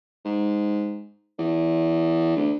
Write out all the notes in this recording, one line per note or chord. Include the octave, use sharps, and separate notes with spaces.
G#2
E2
D2